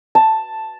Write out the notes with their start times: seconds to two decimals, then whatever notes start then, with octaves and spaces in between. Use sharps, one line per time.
0.15 A5